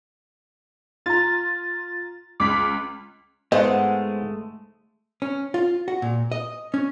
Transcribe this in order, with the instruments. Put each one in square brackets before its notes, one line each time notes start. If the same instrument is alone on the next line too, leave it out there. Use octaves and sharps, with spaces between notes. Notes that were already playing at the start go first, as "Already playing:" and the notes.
[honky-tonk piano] F4 [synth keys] A#5 A6
[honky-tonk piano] C#2 B6 [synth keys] D6
[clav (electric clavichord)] G#2 B3 [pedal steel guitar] G#3 A3 [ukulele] C5 F5 F#5 [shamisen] D#5
[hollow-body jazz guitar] C#4
F4
F#4
A#2
D#5
C#4